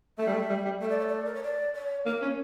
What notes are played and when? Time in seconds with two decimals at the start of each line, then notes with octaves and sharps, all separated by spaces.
0.18 A3 E5
0.27 G3
0.34 A3
0.49 G3
0.65 G3
0.81 A3 E5
0.89 D5
0.98 C#5
1.06 D5
1.24 A#4
1.34 C#5
1.43 D5
1.75 C#5
2.06 A#3 A#4
2.22 C#4